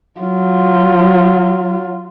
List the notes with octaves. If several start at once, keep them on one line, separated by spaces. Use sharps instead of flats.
F#3 F4